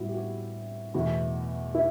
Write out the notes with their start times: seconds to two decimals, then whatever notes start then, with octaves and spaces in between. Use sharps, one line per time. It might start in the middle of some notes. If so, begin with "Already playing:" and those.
Already playing: A2 G3 B3 E4 F#4
0.09 G4
0.14 F#4
0.94 E2 B2 A3 E4 F#4
1.75 E4